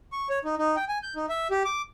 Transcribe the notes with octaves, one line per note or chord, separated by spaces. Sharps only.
C#6
C#5
D#4
D#4
G5
G#5
G6
D#4
E5
G4
D6